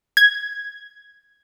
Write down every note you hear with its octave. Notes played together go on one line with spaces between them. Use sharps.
G#6